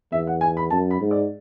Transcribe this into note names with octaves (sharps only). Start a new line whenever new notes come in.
E2 E5
F#5
G#5
B5
F#2 A5
B5
G#2
D5